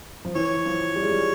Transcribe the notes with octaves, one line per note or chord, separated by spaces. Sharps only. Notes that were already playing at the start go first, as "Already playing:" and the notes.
F3
E3 C#5
F3
G3
G#3
G3